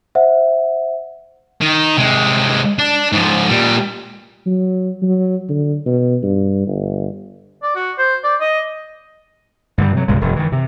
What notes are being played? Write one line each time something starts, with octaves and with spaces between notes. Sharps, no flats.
C5 E5 F#5
D#3
C3 G#3
D4
G#2 F3
A#2 G3
F#3
F#3
D3
B2
G2
G1
D5
F#4
C5
D5
D#5
G2 D3 G3
C3 F#3
B1 G2 C#3 G#3
E1 F#2
D#3 E3
C3